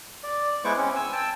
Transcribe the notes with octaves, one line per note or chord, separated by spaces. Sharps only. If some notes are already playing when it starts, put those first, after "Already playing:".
D5
G#3 B3 E4 C5 C#6 D6
C4 C#4
G#5 E6
G5 A5 E6